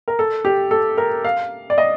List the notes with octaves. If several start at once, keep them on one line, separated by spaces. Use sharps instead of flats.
A#4
A4
G4
A4
A#4
F5
D5
D#5